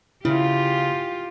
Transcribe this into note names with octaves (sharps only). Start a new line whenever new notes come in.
C#3 E4 F4 G4